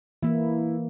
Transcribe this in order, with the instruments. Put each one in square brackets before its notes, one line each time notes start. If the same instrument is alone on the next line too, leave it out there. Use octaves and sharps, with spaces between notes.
[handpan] E3 A#3 [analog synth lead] E4